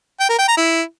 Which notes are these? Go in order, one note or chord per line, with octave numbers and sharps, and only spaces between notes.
G5
A#4
G5
A#5
E4